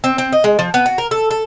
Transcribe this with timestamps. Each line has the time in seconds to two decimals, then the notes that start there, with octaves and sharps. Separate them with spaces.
0.04 C4
0.18 C4
0.32 D#5
0.44 G#3
0.59 F3
0.74 B3
0.86 F#4
0.98 A#4
1.11 A4
1.31 A4